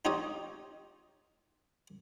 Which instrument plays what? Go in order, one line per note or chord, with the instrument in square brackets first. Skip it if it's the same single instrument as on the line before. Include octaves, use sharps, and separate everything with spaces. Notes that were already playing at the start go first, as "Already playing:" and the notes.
[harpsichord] D#4 F4 G4 C#5 D#5